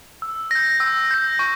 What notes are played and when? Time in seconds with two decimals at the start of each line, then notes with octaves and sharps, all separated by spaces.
0.22 E6
0.51 G6 A#6
0.80 E6
1.11 G6 A#6
1.39 C#6